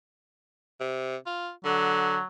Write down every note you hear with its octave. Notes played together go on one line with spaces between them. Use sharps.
C3
F4
D3 F#3